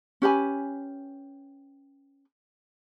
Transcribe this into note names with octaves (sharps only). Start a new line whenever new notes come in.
C#4 G4 B4 G#5